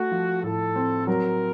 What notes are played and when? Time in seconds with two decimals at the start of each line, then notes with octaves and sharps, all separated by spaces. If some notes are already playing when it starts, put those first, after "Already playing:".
Already playing: A3 F#4
0.11 F3
0.43 A2 A4
0.76 C4
1.07 F#3 A#4